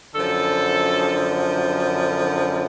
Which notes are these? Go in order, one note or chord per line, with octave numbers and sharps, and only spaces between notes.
F#2 D3 F3 A4